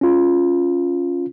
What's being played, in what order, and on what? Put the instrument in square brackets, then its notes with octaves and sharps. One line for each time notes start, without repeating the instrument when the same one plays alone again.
[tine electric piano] C#4 F4